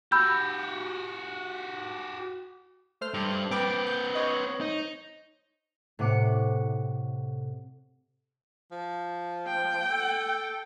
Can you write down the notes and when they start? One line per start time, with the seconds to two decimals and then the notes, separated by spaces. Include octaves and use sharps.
0.12 F#4 G4 B5 E6 G6
3.01 A3 C5 F6
3.14 G2
3.51 C4 B4 G5 D6
3.87 G6
4.15 C5 C#5 D#5
4.61 D#4
5.99 A2 C3 F#5 D6 C7 C#7
8.72 F3
9.47 G5
9.91 A4